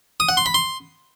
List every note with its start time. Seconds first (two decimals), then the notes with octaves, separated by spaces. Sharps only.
0.20 D#6
0.29 F#5
0.37 C6
0.46 B5
0.54 C6